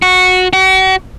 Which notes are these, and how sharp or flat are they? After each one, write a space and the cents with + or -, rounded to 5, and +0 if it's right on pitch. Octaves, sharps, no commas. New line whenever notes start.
F#4 -10
F#4 +40